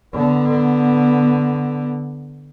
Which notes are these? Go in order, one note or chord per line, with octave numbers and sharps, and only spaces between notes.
D3 B3